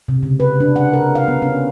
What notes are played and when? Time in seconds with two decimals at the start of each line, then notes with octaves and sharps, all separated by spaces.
0.08 C3
0.23 C#3
0.40 B4
0.60 D4
0.76 F#5
0.93 A#4
1.15 F5
1.28 B3
1.42 C#4